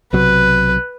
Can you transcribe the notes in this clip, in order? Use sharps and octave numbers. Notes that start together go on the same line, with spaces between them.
B1 C3 F#3 B4